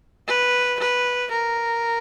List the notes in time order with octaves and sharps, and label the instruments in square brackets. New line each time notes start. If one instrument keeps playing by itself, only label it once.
[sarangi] B4
B4
A#4